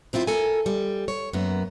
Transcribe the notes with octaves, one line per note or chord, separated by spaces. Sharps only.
F#2 C4 E4 F4
A4 A#4 G#5
G3
C#5
F#2 A#3 B3